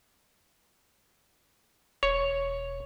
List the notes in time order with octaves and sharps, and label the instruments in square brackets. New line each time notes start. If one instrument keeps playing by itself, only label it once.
[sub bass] E1 [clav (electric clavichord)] C#5